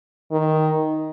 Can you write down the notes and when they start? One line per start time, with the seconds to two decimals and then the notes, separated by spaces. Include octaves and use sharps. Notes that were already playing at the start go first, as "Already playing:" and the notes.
0.31 D#3